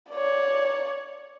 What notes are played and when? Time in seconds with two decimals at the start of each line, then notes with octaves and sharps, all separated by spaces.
0.11 C#5 D5